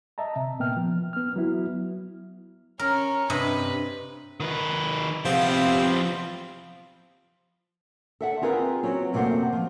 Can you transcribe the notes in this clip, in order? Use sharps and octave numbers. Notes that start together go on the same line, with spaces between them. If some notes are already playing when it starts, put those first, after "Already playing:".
D#5 E5 A5 A#5
C3
A#2 A#3 B3 G5 F6
F3
B3 F6
F#3 B3 E4 F#4
C#4 A#4
G2 C3 B4 D#5
D#3 B4
C3 F3 B3 C4 F5
A4 E5 F#5
C4 F4 G#4 A#4 B4
F#3 C4 C#4
F#2 C3 A3 A#3 C5 F#5
F3